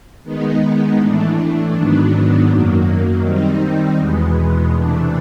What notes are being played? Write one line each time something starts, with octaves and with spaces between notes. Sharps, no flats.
D#3 G#3 B3 D#4
A2 E3 A3 D4
G#2 D#3 F#3 B3 D4
F#2 D#3 F#3 A#3
D#3 G3 C4 D#4
E2 B2 G#3 B3
C3 E3 A3 D4